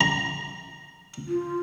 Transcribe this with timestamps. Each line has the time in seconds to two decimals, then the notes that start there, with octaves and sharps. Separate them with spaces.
0.01 A#5
1.28 F4